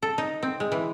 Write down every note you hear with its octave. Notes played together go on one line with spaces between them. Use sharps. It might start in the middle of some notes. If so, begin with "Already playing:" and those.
A4
D#4
C4
G#3
E3